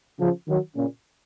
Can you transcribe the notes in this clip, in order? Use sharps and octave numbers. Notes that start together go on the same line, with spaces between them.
C#3 F3
D#3 F#3
A#2 C#3